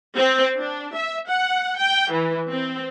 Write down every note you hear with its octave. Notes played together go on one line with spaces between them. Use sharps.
C4
D4
E5
F#5
G5
E3
C4